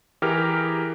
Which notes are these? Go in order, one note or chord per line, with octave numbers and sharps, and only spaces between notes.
E3 G4 G#4 A#4 F6